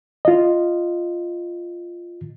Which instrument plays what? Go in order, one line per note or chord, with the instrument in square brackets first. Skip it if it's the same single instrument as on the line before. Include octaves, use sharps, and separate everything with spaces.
[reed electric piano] F4 D#5